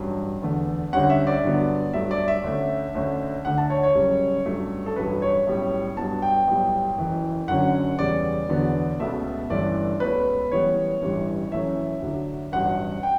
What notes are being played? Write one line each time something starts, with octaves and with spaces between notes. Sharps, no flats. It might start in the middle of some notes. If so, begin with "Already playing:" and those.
Already playing: A1 G2 F#3
E2 D3 A3
D2 D3 G3 C#4 F#5
E5
D5
G2 D3 F#3 B3
G2 F#3 A3 E5
D5
E5
D2 D3 A3 C#4
D2 D3 A3 C#4
D2 D3 A3 F#5
A5
C#5
C#5
F#1 F#2 C#3 G3
G2 F#3 A3 C#4
A4
A1 G2 F#3 B4
C#5
B1 A2 G3 C#4
G2 F#3 B3 A5
G5
B1 A2 G3
F#1 F#2 E3
F#1 F#2 D3 F#3 C#4 F#5
E2 C#3 G3 D5
E1 E2 D3 F#3 B3
C#2 B2 A3 E5
G1 G2 E3 A3 C#4 D5
C#2 B2 A3 C#4 B4
F#2 E3 G3 B3 C#5
A1 G2 E3 G3
F#2 E3 A3 C#4 E5
D2 D3 F#3
A1 G2 F#3 F#5
G5